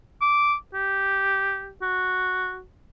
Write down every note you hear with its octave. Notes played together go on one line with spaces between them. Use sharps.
D6
G4
F#4